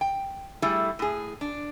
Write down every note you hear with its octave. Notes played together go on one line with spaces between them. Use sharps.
G5
G3 A3 E4 G#4
A2 G#4
D4